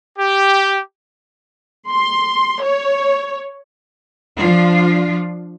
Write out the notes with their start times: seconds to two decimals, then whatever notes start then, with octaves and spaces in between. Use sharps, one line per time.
0.16 G4
1.90 C6
2.63 C#5
4.37 F3 D4 F4